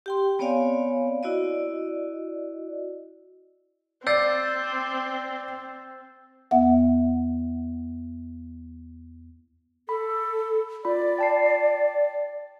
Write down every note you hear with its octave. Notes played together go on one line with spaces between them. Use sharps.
G4 G5 C6
B3 C4 C#5 D5 F5 G#5
E4 F#4 D5 D#5
C4 D5 E6 G6 A6 C7
E2 B3 E5 F#5
A4 B5
F4 D5 B5
G5 A5 C7